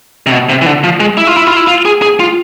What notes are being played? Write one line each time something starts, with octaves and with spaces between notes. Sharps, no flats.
C3
B2
C3
E3
D3
F3
G#3
E4
F4
E4
F4
E4
F4
G#4
G#4
F4